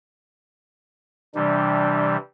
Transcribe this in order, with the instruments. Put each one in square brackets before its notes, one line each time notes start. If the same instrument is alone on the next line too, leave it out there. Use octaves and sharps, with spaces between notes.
[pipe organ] C3 E3 G3 [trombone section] D4